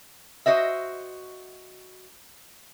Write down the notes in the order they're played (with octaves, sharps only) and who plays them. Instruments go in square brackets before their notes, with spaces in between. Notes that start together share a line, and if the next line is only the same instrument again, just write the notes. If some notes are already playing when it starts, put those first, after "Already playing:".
[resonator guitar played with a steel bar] F#4 C5 D#5 E5